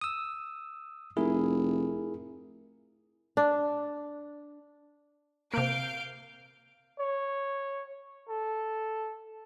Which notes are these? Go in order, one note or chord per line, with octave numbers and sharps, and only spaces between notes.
D#6 E6
F1 E4 G#4 A#4
D4
C3 A#3 F5 G6 D7
C#5
A4